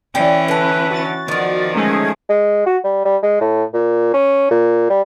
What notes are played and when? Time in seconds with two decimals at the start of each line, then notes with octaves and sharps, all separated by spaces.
0.15 E3 C#4 D5 G5
0.48 D3 B4 A5
0.91 F#4 A6
1.28 D#3 F3 B3 A#4 D5
1.75 G#3 A3 C#4 D#4 G#4
2.29 G#3
2.66 F#4
2.84 G3
3.05 G3
3.23 G#3
3.41 A2
3.74 A#2
4.14 C#4
4.51 A#2
4.90 G3